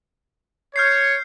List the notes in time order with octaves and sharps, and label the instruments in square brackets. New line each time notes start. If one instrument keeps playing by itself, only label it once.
[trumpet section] C#5 [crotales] F6 G6 C7